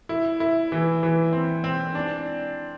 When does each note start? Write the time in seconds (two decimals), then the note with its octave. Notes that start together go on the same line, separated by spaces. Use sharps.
0.09 E4
0.40 E4
0.72 E3
1.03 E3
1.33 C4
1.64 C4
1.95 D4